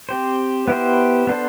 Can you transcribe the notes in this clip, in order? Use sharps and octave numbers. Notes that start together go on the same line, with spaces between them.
C4 G4 C5
B3 E4 G4 C5
B3 D4 A4 C5